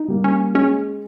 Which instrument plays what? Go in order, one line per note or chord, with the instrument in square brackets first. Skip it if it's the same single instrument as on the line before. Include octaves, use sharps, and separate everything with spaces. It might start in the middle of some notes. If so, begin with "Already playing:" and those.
Already playing: [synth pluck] D#4
[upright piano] G3 A#3
[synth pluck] C#4
[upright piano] G#3 [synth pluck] C#4